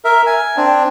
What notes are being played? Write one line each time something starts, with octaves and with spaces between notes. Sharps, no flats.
A#4 E5
G#5
C4 D4